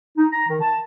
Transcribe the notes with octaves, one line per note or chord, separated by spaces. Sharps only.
D#4
A#5
D#3
A5